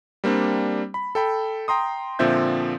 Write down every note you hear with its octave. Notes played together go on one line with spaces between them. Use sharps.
G3 A#3 C4 D4
B5
A4 G5 B5
G5 A#5 C6 D#6
A#2 D3 F3 C4 E5 G6